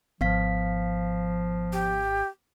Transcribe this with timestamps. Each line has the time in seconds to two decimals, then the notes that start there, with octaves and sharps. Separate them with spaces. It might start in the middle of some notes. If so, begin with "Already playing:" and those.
0.21 G#1 F3 B3 F5 B6
1.73 G4